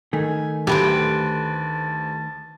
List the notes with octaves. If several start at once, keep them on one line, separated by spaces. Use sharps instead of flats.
D#3 A3 G#5
D2 G4 B4 C5 A5